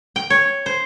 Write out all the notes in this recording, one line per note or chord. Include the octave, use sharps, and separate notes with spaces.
G5
C#5
C5